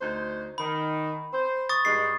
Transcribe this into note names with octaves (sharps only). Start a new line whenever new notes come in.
D2 D#4 C5
D#3 B5
C5
C#6 D#6 A6
G2 G#3 D#4 C7